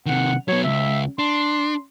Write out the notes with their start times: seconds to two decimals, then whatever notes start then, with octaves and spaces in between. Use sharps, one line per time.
0.06 C3 D#3 F#5
0.48 F#3 B3 C#5
0.64 C#2 E5
1.19 D4 C6